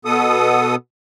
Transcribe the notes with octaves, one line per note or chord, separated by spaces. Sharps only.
B2 B3 A4 D#6